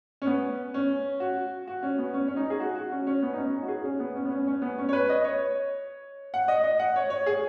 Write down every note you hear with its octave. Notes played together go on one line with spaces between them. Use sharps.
C#4
B3
C#4
F#4
F#4
C#4
B3
C#4
C#4
D#4
G#4
F#4
F#4
C#4
C#4
B3
D#4
C#4
D#4
F#4
G#4
C#4
B3
C#4
B3
C#4
C#4
B3
C#4
C#5
B4
D#5
C#5
F#5
D#5
D#5
F#5
C#5
C#5
G#4